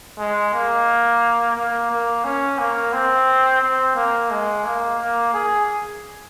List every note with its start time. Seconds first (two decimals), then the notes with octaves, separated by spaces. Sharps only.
0.18 G#3
0.54 A#3
1.57 A#3
1.91 A#3
2.24 C#4
2.59 A#3
2.93 C4
3.61 C4
3.96 A#3
4.31 G#3
4.65 A#3
4.99 A#3
5.34 G#4